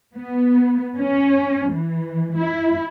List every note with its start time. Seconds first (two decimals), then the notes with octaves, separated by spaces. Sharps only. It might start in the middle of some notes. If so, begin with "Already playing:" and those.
0.15 B3
0.97 C#4
1.72 E3
2.37 E4